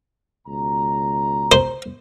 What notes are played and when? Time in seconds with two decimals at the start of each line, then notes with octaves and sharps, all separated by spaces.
0.46 C#2 B2 A#5
1.52 C5